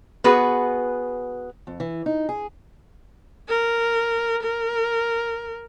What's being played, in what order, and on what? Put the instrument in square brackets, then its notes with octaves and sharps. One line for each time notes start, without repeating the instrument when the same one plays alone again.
[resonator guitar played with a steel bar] B3 F#4 G#4 B4
[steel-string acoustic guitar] F2
E3
D#4
G#4
[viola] A#4
A#4